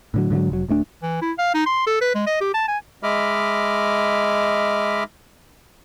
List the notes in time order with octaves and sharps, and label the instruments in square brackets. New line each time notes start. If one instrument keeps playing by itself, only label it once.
[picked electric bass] A2 D3 F#3
G#2 D3 F3 F#3
F1 F#3
D1 D2 A3 D4
[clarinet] E3
E4
F5
D#4
C6
A4
B4
G#3
D#5
G4
A5
G#5
[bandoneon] G#3 D#5 E5 B5 D6 F6